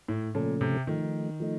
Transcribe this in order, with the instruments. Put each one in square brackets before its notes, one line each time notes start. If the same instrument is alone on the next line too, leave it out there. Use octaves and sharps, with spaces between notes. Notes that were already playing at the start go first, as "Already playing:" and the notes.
[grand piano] A2
[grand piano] A#2 [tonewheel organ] C#3 F3 A3 C#4 A4
[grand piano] C3
[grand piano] D#3 [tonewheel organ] F3 A3 D#4
[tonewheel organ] F3 A3 D#4